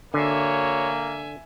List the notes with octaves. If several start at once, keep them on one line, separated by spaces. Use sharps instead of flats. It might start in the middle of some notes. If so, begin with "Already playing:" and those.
D3 A#3 F#4 C#5 E5 G#5